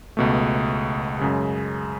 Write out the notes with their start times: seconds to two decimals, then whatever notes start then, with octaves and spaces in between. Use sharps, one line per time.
0.17 C#2 B2 A3
1.19 F#2 C#3 G#3